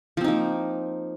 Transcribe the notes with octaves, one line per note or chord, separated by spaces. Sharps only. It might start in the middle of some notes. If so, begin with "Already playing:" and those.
F3 A#3 C4 D#4